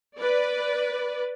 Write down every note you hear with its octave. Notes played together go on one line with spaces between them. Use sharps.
B4 D5